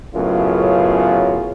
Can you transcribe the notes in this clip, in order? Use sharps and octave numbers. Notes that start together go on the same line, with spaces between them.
F#2 A2 C#3 B3 F4